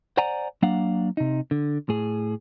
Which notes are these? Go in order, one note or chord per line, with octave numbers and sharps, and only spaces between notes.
C5 D5 F#5 G#5 A#5
F#3 A#3 D4 F5 F#5
C3 D#4
D3
A2 G#4